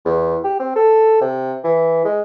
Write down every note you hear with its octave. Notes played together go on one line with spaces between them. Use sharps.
E2
G4
C4
A4
C3
E3
G#3